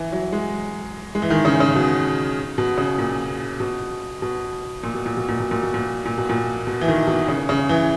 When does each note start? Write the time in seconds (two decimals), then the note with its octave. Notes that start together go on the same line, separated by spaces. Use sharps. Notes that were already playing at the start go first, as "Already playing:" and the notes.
Already playing: E3
0.12 F#3
0.32 G#3
1.15 G#3
1.22 E3
1.30 D#3
1.45 C#3
1.60 C#3
1.75 B2
2.58 B2
2.78 C#3
2.98 A#2
3.60 B2
4.22 B2
4.83 A#2
4.94 B2
5.06 A#2
5.17 B2
5.29 A#2
5.40 B2
5.51 A#2
5.63 B2
5.74 A#2
6.05 A#2
6.18 B2
6.29 A#2
6.67 B2
6.81 E3
6.88 D#3
7.07 B2
7.28 C#3
7.49 C#3
7.69 E3